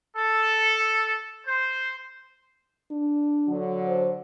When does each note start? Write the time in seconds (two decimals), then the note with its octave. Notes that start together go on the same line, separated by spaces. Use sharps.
0.16 A4
1.47 C5
2.91 D4
3.47 D3 F#3
3.87 C5